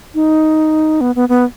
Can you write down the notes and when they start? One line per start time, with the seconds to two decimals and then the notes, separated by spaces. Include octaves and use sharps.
0.15 D#4
1.01 B3
1.15 B3
1.29 B3